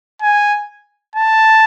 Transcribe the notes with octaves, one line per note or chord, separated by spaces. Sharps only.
G#5
A5